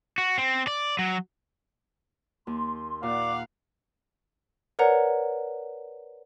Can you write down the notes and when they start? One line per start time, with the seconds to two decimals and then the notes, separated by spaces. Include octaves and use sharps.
0.18 F#4
0.38 C4
0.67 D5
0.99 F#3
2.47 D#2 C6
3.03 A#2 D5 F5 F#5 D6
4.79 A#4 B4 C#5 D5 F#5 A#5